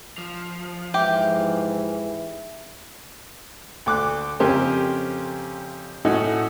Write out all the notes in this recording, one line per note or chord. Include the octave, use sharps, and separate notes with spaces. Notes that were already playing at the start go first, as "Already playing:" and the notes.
F3
G#2 E3 G4 E5
D2 D6 F#6
F2 C#3 C#4 G4 A#4 C5
A2 C#4 D#4 F#4 A4 F#5